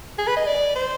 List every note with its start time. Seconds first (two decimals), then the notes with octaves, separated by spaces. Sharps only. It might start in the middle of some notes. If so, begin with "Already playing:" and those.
0.18 G#4
0.27 B4
0.37 D#5
0.47 D5
0.75 C5